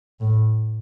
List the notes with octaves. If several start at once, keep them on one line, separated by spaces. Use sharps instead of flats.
A2